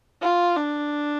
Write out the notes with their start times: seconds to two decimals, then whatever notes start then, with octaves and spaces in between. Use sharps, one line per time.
0.22 F4
0.56 D4